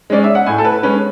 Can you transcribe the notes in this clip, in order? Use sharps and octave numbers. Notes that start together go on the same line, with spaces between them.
G#3 C#4 D5
E5
F#5
A2 G#5
A4
B4
G#3 C#4 B4